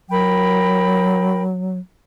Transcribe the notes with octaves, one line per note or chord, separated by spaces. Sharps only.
F#3 A#4 G5 B5